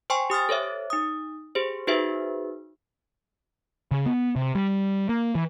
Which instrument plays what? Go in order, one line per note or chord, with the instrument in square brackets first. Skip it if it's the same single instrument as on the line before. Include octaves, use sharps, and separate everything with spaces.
[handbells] C5 G5 G#5 C6 C#6
G4 D#6 F6 A6
A4 C5 C#5 E5
D#4 D#6
G4 G#4 C5
D#4 F#4 G#4 B4 C5 E5
[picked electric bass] C#3
B3
C3
G3
A#3
E3